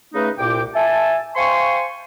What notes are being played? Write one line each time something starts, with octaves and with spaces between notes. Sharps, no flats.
C#3 A3 D#4 B4
C2 A#2 G5 D6
E5 G#5 A5
C5 F5 G5 G#5 C6 C#6